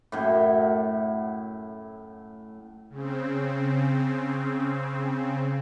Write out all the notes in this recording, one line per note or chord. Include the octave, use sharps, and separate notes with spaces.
F#2 A2
C#3 C4